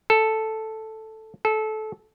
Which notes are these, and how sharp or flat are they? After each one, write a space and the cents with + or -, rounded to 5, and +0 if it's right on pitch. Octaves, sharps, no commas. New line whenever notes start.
A4 +0
A4 -20